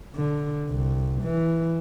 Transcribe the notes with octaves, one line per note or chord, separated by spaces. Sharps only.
D3
C2
E3